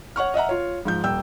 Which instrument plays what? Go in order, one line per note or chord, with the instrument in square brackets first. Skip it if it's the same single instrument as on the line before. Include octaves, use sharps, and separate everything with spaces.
[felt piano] C#5 F#5 C#6 F6
D#5 E5 F#5 A#5
F4 C#5
G#2 F3 G6
D#1 G5 E6 G6